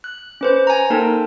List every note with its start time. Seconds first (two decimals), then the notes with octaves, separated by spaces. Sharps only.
0.04 F#6
0.41 C#4 B4 C5
0.67 G#5 A#5
0.90 A#3 D#4 A4 A#4 G5 A5